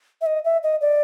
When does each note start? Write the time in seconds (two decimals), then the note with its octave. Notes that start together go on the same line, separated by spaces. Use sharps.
0.21 E5
0.26 D#5
0.45 E5
0.63 D#5
0.81 D5